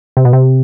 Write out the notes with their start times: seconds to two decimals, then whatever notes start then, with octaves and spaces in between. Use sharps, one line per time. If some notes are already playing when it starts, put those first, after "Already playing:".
0.17 C3
0.25 B2
0.33 C3